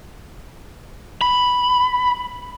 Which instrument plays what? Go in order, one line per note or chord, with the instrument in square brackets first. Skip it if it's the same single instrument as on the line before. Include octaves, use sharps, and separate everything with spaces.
[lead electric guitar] B5